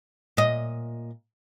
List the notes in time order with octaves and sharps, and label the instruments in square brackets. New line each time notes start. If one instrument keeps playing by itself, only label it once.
[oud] A#2 D#5